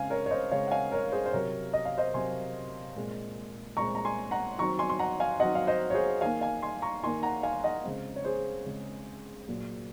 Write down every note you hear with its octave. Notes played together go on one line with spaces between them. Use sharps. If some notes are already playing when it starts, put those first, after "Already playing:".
Already playing: C#3 G#3 C4 F5 G#5
A#4 C#5
C#5
C5 D#5
C#3 G#3 C4 C#5 F5
F#5
F5 G#5
A#4 C#5
G#4 C5
C5
C3 F#3 C4 A#4 C#5
D#5
F5
C5 D#5
C3 F#3 C4 G#5 C6
A#2 G#3 C4
A#2 G#3 C4 A#5 C#6
A#5
G#5 C6
F#5 A#5
D#3 F#3 C4 A#5 C#6
G#5 C6
C6
F#5 A#5
F5 G#5
D#3 F#3 C4 D#5 F#5
F5
C5 D#5
C#5
G#4 C5
D#3 A#3 F5 G#5
F5 G#5
G#5 C6
A#5 C#6
D#3 A#3 G#5 C6
F#5 A#5
F5 G#5
D#5 F#5
C#3 G#3 C4
C#5
G#4 C5
C#3 G#3 C4
A#2 F#3 A#3